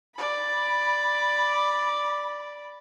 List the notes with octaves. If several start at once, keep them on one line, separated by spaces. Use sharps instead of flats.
D5 B5